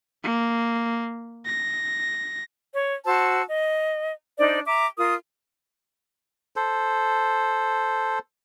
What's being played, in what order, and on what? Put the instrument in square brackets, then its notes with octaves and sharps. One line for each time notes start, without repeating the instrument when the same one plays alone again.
[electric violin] A#3
A#6
[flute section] C#5
F#4 C5 A5 E6
D#5
D4 D#4 C5 D5
E5 A#5 D6
F4 A#4 D#6
[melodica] A4 C5